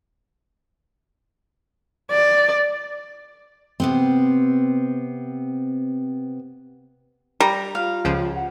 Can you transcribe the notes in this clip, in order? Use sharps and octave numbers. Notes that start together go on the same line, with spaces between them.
D5
C3 B3 C4
G3 A#5
F4 F5
C#2 C#3 F3
F#5